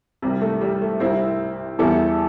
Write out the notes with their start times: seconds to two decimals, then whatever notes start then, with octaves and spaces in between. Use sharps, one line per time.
0.22 C2 C3 G3
0.42 A3
0.61 G3
0.82 A3
1.00 C2 C3 G3 C4 E4
1.79 E2 E3 G3 E4 A4